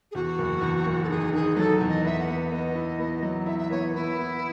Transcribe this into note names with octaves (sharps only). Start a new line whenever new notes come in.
G#4
E2 F#4
F#1
E2
F#1
A4
D#3 G#4
D#3 G#4
F#3 A4
E2
D#5
B3 E5
F#5
B3
B3 D#5
E4
B3
F#3
E4 E5
E5
B3 C#5
B3 E4
B3